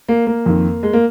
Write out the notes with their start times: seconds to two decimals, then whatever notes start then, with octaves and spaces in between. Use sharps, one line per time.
0.09 A#3
0.27 A#3
0.46 F2 D#3
0.83 G#3
0.93 A#3